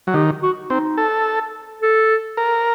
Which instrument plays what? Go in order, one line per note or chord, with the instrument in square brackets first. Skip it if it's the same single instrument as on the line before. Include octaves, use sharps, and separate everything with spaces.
[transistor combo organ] F#3
[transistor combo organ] D#3 [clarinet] G4
[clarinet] F#4
[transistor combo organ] C4 [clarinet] D#4
[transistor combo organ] A4
[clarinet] A4
[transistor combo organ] A#4